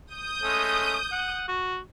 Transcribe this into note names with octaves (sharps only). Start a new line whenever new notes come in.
D#6 G6
G#3 A3 C#4
F#5
F#4